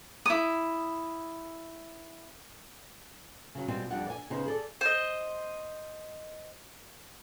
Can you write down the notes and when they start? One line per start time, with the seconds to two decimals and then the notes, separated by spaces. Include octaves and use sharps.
0.26 E4 D#6
3.55 C#3 F#3
3.68 B2 G3 C4 F4 G5 G#5
3.90 F2 G3 D4 F#5
4.07 D5 G#5
4.30 C#3 B3 D#4 C5
4.46 G#4 A4 D5
4.81 C5 D#5